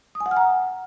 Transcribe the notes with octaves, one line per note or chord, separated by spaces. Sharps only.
D#6
G#5
F#5
F6
A#5